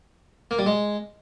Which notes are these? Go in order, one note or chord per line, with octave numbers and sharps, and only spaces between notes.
A#3
G3
G#3